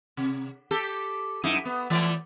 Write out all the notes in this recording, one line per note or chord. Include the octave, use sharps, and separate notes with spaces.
C3
G4 A4
F#2 D#4 E4
B3
E3 A3 D5